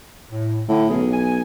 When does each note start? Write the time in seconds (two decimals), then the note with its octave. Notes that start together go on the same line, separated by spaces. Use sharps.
0.31 A2
0.68 A2 D3
0.89 B1 C#4 G#4
1.13 G#5